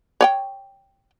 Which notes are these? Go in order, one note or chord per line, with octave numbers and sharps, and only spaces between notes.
C#5 D5 G5